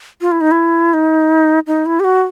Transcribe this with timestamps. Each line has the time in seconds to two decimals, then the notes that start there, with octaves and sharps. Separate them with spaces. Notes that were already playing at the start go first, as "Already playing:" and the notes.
0.21 F4
0.31 E4
0.41 D#4
0.51 E4
0.93 D#4
1.67 D#4
1.86 E4
2.00 G4
2.04 F#4